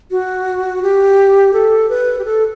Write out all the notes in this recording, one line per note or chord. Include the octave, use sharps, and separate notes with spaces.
F#4
G4
A4
B4
G4
A4